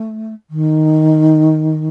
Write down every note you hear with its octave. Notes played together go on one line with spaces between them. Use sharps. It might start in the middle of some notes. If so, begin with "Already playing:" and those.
Already playing: A3
D#3